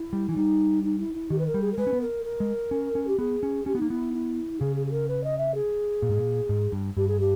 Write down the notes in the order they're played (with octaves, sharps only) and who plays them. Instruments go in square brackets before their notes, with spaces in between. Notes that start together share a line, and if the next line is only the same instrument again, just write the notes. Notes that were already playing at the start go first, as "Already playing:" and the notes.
Already playing: [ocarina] E4
[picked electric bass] G3
[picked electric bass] E3 [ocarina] E4
[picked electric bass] G3 [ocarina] D#4
[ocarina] D#4
E4
E4
[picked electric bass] D#3 [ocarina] G4
[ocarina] B4
A#4
[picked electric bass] G3
[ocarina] G#4
A#4
[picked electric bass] G#3 [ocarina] B4
[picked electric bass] C#4
B3
[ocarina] A#4
A#4
[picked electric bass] G#3
C#4
C#4
[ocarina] G4
[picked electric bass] B3 [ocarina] G#4
[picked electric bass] C#4
[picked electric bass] C#4 [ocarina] G4
[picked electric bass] B3
[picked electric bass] A#3 [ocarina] D#4
[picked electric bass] B3 [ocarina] E4
[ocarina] E4
[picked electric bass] C#3 [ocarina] G#4
[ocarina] G#4
G#4
A#4
B4
D#5
E5
G#4
[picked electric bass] A#2
G#2
A#2
G#2
G2
[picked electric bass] G2 [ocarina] G4
[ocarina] G#4
G4